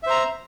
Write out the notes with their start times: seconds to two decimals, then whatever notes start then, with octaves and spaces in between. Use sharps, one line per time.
0.03 E5
0.07 C5
0.10 A#5